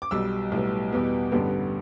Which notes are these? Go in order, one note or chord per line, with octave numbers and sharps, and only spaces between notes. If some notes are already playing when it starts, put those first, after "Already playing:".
D6
B1 B2 G3 E6
B1 A2 G3 B3
E2 B2 G3 B3
A1 G2 D3 G3 B3